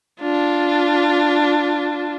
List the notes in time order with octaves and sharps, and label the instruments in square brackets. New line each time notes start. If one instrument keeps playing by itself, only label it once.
[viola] D4 F4